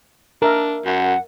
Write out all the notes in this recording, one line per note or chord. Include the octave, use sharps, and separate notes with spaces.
D4 A#4 E5
F#2 F#5